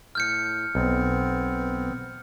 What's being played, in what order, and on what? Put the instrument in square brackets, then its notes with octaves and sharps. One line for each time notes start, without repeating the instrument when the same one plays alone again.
[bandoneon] A2 [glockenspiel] F6 G6 C#7
[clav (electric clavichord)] B1 [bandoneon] B3 C4